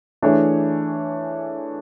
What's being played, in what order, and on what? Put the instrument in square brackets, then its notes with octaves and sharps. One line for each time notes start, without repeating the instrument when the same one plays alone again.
[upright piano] E3 A3 D4 G#4 C#5